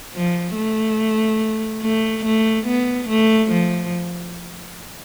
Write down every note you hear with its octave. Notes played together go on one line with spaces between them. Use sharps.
F3
A3
A3
A3
B3
A3
F3